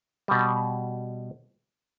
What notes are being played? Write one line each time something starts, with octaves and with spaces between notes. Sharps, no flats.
B2 G3